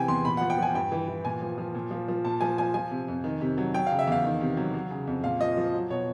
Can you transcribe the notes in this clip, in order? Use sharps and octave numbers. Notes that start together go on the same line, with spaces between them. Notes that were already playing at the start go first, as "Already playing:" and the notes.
Already playing: C3 E3 G5 G#5
E2 C6
A#2 B5
F3 F#5
G5
F3 G#5
G2 G5
E3
E3
A#2 G#5
F3
F3
A#2
F3
F3
A#2 A5
F3 G#5
F3 G#5
F3 G#5
C3
F2
D#3
C3
F#3
F#3 G5
C#3 F5
E5
E2 F5
D#3
C3
F#3
F#3
C#3
F2
A#2 F5
F3 D#5
F3
F#3
B2 C#5